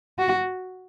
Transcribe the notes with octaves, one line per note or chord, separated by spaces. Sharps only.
F#4